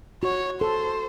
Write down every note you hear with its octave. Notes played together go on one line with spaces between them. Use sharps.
F#4 C#5
A4 C5